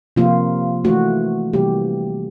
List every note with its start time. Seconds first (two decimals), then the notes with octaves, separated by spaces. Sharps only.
0.16 C3 F3 A#3 F4
0.84 E3 A3 F#4
1.53 C3 E3 G3 A#3 G4